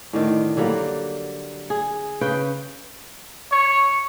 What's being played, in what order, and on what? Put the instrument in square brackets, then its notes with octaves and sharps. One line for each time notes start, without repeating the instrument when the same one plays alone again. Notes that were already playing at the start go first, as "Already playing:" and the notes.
[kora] A2 D3 D#3
D3 F#3 G3 A#3
G#4
C#3 B4 G5
[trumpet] C#5